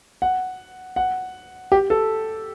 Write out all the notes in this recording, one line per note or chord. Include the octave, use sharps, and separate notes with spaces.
F#5
F#5
G4
A4